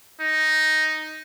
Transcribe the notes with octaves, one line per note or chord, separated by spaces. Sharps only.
D#4